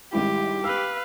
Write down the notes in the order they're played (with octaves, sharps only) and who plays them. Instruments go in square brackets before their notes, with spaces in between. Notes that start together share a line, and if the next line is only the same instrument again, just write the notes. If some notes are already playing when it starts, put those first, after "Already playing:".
[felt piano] G#1 G3 E4 [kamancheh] G4
[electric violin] B4 F5 [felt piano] E6